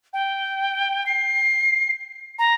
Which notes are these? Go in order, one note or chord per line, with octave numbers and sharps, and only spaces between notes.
G5
C7
A#5